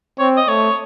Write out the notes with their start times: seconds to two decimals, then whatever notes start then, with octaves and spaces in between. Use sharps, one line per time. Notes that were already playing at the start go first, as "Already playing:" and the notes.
0.18 C4 C#5
0.37 D#5
0.48 A3 C#5